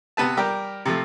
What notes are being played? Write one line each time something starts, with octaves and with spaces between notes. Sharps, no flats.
C3 B3 B4 A5
G3 G4 A#4
C3 F3 A3